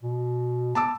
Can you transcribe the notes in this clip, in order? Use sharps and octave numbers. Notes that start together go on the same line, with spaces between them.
B2
B3 A5 D6 E6